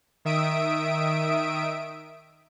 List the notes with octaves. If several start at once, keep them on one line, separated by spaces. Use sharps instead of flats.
D#3 E5 D#6 D7